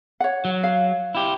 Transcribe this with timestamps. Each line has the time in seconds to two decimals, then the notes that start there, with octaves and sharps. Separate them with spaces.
0.20 C#5 F#5
0.45 F#3
0.63 F5
1.15 E4 G4